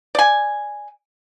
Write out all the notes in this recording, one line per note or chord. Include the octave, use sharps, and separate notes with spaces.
D5 G#5